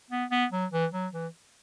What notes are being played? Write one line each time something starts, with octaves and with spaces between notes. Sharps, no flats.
B3
B3
F#3
E3
F#3
E3